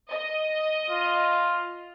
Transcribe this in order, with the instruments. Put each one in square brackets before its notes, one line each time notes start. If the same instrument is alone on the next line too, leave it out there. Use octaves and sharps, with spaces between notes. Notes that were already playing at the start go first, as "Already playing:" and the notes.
[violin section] D#5
[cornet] F4